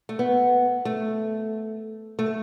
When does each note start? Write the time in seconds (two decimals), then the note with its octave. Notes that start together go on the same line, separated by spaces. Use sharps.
0.09 A3
0.19 B3
0.85 A3
2.19 A3